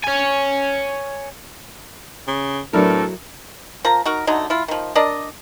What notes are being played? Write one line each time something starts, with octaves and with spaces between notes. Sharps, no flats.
C#5 G#5
C#3
A2 F#3 A3 B3 D4 E4 A4 A#4
F3 A#4 A#5
D#4 F#4 A#4
D3 F#3 A3 D#4
E4 F4
D#3 F3
D4 A#4 D5 D#5